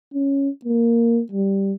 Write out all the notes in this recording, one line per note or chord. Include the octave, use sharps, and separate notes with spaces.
C#4
A#3
G3